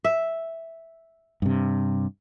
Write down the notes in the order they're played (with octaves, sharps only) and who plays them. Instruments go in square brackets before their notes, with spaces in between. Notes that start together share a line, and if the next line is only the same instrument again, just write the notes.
[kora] E5
[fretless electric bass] G2 C3